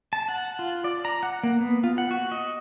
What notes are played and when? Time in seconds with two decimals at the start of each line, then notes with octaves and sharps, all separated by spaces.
0.13 A5
0.28 F#5
0.59 F4
0.84 D5
1.05 A#5
1.23 F#5
1.43 A#3
1.61 B3
1.84 F4
1.98 F#5
2.11 F#4
2.32 D#5